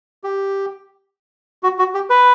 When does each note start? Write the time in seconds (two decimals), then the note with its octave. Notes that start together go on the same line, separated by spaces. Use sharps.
0.24 G4
1.63 F#4
1.79 F#4
1.94 G4
2.10 B4